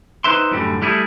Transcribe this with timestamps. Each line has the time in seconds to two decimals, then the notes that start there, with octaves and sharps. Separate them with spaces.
0.24 D#4 B4 C5 E5 C6
0.51 F#2 A2 D3 G3
0.82 G3 A3 E4 G#4